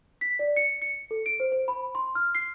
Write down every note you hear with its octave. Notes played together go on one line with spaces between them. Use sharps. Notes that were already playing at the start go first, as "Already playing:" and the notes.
B6
D5
C#7
C#7
A4
D7
C5
C5
B5
C6
F6
C7